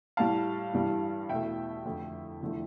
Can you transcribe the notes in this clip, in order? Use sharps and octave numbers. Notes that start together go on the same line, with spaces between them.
A2 G3 F5 A5
G2 E3 G3
E2 B2 A3 E5 G5
F2 D3 A3
E2 D3 F3 A3